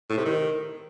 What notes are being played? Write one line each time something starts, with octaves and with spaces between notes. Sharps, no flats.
A2
C3
D#3